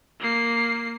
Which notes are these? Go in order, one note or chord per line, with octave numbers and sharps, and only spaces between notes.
A#3 C7